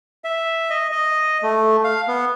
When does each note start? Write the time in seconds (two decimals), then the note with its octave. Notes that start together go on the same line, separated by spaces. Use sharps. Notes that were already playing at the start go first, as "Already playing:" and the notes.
0.24 E5
0.70 D#5
0.92 D#5
1.43 A3
1.84 F5
2.08 B3